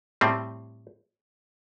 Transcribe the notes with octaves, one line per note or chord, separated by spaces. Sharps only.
A2 G3 C4